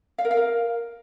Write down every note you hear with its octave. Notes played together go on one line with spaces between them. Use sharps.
F5
A#4
F5
A#4